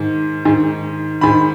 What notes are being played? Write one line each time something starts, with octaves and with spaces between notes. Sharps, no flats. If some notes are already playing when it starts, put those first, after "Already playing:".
Already playing: G#2 D#3
G#2 D#3
G#2 D#3 B5